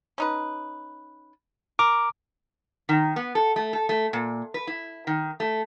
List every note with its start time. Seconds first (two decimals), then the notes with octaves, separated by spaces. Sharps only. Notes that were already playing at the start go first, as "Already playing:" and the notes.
0.18 C#4 D#4 B4
1.79 A#4 D6
2.89 D#3
3.16 B3
3.35 A4
3.56 A3
3.73 A4
3.89 A3
4.13 A#2
4.54 B4
4.67 E4
5.07 D#3
5.40 A3